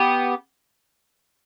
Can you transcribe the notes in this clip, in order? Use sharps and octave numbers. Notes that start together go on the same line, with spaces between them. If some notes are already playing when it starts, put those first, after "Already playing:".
Already playing: B3 G4